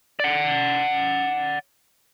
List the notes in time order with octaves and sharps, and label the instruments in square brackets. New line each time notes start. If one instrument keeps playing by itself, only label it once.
[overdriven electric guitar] D5 F#5